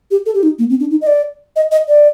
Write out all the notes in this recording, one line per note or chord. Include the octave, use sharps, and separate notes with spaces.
G4
A4
G4
D#4
A#3
C4
D4
D#4
D#5
D5
D#5
D#5
D5